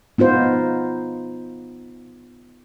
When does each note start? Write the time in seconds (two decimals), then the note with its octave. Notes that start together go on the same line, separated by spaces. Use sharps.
0.18 B3 D#4 F4 C5